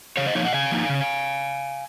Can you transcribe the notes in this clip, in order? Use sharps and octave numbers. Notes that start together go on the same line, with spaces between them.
C#3 C#5 F5
C5 D#5
F3 A#3 D#4 C#5 F5
D#5 F#5
C#3 F5 G#5
F3 A#3 D#4
C#3